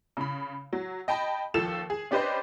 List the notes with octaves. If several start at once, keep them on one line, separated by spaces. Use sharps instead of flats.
C#3 B5
F#3
D#5 G5 A5 B5
D#2 F3 A4 E7
G#4
C#4 D4 G4 B4 C5 D#5